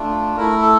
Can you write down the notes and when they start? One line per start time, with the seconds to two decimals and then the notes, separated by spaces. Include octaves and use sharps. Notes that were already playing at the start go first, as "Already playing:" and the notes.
Already playing: A3 D4 F4
0.37 A3 E4 A#4
0.62 A4